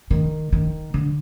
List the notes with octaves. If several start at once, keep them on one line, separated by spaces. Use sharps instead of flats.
D#3
D#3
D3